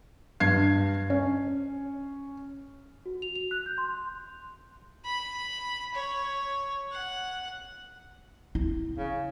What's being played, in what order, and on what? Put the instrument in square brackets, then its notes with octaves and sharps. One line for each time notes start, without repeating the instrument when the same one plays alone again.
[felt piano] G2 G#6 C7
C#4
[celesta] F#4
F7
F7
F#6
G6
C6
[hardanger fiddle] B5
C#5
F#5
[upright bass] E4
[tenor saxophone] C#3